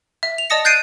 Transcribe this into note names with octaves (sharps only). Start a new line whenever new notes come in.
E5
F7
D5 D#5 A5 D#6 A#6 C#7
F#6 G6 A6 C7 D7 D#7